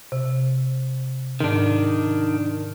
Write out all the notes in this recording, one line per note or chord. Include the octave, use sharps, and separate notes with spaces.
C3
G#2 D#3 D4